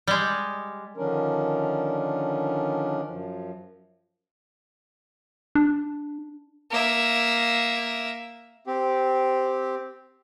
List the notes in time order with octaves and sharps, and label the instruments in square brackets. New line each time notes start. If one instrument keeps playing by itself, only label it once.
[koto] G3 G#3
[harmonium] D3 D#3 F3 C#4 D4 A#4
F#2 F3
[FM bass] D4
[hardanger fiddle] A#3 E5
[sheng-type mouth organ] C4 G4